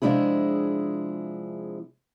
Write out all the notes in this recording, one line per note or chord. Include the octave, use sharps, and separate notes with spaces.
C3 F3 G#3 D4 E4 G#4